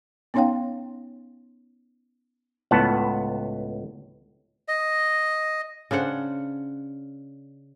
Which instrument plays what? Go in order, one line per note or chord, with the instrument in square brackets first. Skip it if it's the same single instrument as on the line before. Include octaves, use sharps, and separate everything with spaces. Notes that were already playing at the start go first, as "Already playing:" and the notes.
[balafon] B3 C#4 D#4 C#5 F5 G5
[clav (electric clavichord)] C#2 A2 B3 F#5 A5
[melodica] D#5
[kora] C#3 D4 C5 F#5